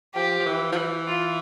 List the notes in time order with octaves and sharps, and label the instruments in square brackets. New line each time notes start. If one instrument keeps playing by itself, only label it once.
[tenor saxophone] F3 [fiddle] G4
[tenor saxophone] F3
E3
F3
E3
[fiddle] F4